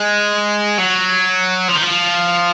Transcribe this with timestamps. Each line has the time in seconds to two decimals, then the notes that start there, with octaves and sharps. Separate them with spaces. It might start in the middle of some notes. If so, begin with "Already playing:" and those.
Already playing: G#3
0.78 F#3
1.68 F3
1.76 D#3
1.82 F3